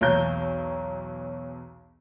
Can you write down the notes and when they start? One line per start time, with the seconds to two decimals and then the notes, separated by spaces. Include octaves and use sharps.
0.01 B1 E2 C#5 A#5 G6